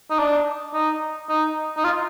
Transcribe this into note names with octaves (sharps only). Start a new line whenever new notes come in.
D#4
D4
D#4
D#4
D#4
F4